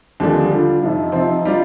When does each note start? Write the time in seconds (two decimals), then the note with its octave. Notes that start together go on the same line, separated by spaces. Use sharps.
0.20 D#2 D3 F3 G3 G#3 D4
0.51 D3 G3 D4 F4
0.82 F2 C3 F3 D#4
1.12 C3 F3 C4
1.45 G3 D4 F4